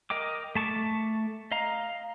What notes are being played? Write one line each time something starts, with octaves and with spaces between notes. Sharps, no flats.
A#4 D#5 G5 D6
A3 A5 C#6 D6
D#5 F5 A#5